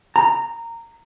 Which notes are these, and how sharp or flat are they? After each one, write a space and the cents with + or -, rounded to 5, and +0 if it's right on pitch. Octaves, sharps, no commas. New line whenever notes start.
A#5 -15